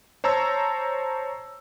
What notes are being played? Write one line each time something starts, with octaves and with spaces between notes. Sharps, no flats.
C5 C#5 A5 A#5 E6